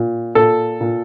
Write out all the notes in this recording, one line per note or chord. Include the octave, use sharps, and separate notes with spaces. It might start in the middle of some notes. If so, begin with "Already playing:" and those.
Already playing: A#2
A#2 A4
A#2